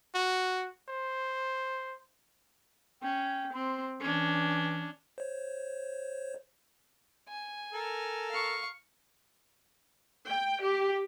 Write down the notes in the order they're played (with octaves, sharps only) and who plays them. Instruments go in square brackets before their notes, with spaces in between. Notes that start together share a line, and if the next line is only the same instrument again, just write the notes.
[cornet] F#4
C5
[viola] C#4 [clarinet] G5
[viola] C4 [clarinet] C6
[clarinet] E3 [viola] C#4 D4
[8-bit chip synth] C5 C#5
[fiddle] G#5
[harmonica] A4 A#4
[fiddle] F5 C#6
[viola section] G5
G4